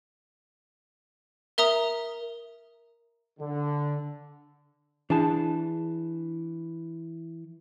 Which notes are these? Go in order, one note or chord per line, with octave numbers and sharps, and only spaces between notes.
A#4 E5 A#5 D#6
D3
E3 D4 G#4 A5